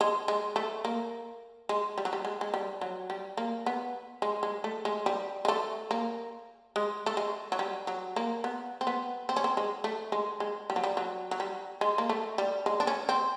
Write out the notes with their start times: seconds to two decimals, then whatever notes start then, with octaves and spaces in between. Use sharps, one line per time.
0.01 G#3
0.28 G#3
0.56 A3
0.85 A#3
1.69 G#3
1.98 G3
2.05 F#3
2.13 G3
2.25 G#3
2.41 G#3
2.54 G3
2.81 F#3
3.10 G3
3.37 A#3
3.66 B3
4.22 G#3
4.43 G#3
4.64 A3
4.85 G#3
5.06 G3
5.45 G#3
5.48 A3
5.91 A#3
6.76 G#3
7.06 A3
7.17 G#3
7.52 F#3
7.59 G3
7.87 F#3
8.16 A#3
8.44 B3
8.81 C4
8.87 B3
9.29 C4
9.36 C#4
9.44 C4
9.57 G#3
9.84 A3
10.12 G#3
10.40 G#3
10.70 G3
10.76 F#3
10.84 G3
10.97 F#3
11.31 F#3
11.40 G3
11.81 G#3
11.98 A#3
12.09 A3
12.38 G3
12.66 G#3
12.80 D4
12.87 C#4
13.09 C4